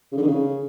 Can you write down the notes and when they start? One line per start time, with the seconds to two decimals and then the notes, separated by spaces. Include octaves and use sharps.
0.12 C#3
0.17 D3
0.22 D#3
0.27 C#3